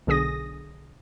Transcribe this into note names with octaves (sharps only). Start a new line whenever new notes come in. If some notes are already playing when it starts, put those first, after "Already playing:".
B1 D3 G#4 D#6 A#6